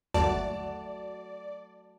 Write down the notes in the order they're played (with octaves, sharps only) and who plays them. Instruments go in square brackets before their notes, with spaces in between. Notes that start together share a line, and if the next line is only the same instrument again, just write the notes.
[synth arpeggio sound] G1 D#2 [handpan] F#3 A3 F#4 [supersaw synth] D5 [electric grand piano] A5